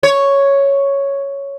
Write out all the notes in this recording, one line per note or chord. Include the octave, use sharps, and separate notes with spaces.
C#5